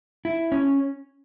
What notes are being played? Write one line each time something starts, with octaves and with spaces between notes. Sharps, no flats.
E4
C#4